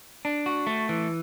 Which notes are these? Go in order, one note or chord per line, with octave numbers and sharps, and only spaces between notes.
D4
F#4
A3
E3